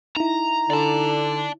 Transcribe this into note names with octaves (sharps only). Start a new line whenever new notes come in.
D#4 E4 A#5
D3 D5 A5